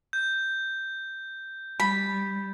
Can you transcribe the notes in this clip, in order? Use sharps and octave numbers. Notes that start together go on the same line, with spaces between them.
G6
G3 B5